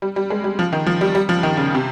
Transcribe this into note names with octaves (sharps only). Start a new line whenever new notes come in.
G3
G3
G#3
G3
F3
D#3
F3
G3
G3
F3
D#3
C#3
C3